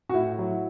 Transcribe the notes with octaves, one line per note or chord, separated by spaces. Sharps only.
F#4
A2 E4
F#3